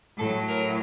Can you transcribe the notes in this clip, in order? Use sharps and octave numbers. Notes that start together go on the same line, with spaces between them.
A2 F#3 A4
A#4